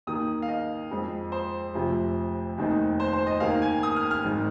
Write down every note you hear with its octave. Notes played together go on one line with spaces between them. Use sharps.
D#2 D#3 A#3 D#6
F5
D#5
F2 F3 G#3 C4
C5
F1 F2 C3 F3
F1 D#2 D#3 C4 D#4
C5
C5
D#5
D#2 D#3 A#3 F5
G#5
D#6
F6
F6
G#1 G#2 D#3 G#3